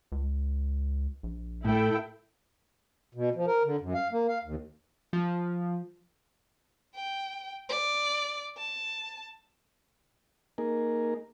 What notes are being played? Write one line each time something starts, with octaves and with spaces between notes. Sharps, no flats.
C#2
A#1
A2 A3 E4 A4 G5
B2
F3
A#4
D3
F#2
F5
A#3
F5
D#2
F3
G5
D5
A5
A#3 D#4 G#4 A#4